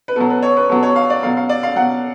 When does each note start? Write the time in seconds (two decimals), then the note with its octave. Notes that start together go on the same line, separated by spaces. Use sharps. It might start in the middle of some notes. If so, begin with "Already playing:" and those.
0.08 B4
0.16 B2 F#3 A4
0.30 B4
0.43 C#5
0.57 B4
0.69 B2 F#3 A4
0.83 C#5
0.96 F5
1.10 D5
1.23 B2 F#3 F5
1.37 F5
1.49 D5
1.63 F5
1.76 B2 F#3 F#5